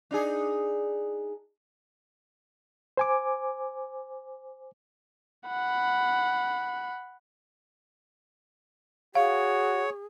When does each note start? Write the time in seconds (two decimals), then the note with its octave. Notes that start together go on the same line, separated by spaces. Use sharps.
0.11 D4 D#4 G#4
2.97 C5 G#5 D6
5.48 F#5 B5
9.15 F#4 G#4 C#5 F5